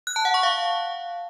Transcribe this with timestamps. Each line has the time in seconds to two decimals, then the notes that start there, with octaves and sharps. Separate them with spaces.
0.07 F#6
0.16 A5
0.25 F#5
0.34 C#6
0.43 F5